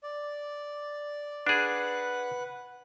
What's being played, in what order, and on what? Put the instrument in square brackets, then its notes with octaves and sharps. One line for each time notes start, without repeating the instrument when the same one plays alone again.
[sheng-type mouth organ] D5
[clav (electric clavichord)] D4 G#4 [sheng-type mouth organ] B4 F#5